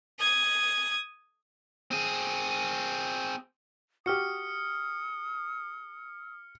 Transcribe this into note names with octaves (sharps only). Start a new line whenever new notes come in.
D#6 G#6
C4 G#4
F#4 G4 D#6 F6 C#7